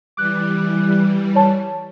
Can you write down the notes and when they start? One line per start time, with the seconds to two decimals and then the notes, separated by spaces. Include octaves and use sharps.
0.17 E3 G3 D6 F#6
1.35 C#5 A5